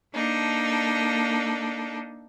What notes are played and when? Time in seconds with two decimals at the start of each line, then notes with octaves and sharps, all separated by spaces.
0.13 A#3 D4 D#4 A4